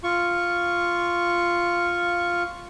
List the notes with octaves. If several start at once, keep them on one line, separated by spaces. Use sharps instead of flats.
F4 C#6